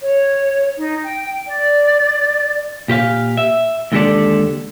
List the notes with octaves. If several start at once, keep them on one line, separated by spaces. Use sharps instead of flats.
C#5
D#4
G5
D5
A#2 G4 C5 F5
E5
D#2 D3 G#3 G4 A4 D5